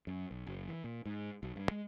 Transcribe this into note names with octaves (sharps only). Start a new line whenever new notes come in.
F#2
B1
F#1
E3
A#2
G#2
B1
G2
G#3